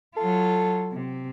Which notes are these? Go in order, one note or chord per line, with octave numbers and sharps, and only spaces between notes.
F#3 F4 A4
C3